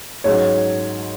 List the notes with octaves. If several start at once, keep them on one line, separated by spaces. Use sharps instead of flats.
G#2 F#3 C#4 C#5